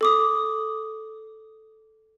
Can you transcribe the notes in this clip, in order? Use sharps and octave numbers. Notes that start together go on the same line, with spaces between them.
A4 D6 D#6